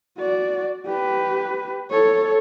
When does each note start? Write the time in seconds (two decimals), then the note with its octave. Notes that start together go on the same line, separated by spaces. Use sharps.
0.19 F#4 D5
0.86 G4 B4
1.91 A4 C#5